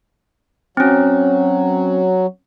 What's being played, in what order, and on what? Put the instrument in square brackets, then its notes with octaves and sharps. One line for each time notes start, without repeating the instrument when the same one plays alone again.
[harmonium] F#3 [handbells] C4 C#4